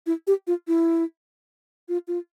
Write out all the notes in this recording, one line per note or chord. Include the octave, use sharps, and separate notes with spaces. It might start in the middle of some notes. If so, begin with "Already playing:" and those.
E4
G4
F4
E4
F4
F4